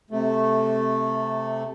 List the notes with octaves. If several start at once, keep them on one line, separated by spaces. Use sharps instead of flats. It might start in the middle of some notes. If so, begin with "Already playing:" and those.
C3 A3